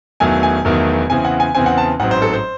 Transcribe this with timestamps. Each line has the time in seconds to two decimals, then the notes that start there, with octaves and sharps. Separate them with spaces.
0.20 E1 E2 D#3 F#3 A3 G#5
0.43 G#5
0.65 E1 E2 D#3 F#3 A3
1.10 E2 C#3 E3 C4 G#5
1.25 F#5
1.40 G#5
1.55 E2 C#3 E3 C4 G#5
1.66 F#5
1.78 A5
2.00 A1 G#2 F#3 C4 F#5
2.11 C5
2.22 A4
2.33 C5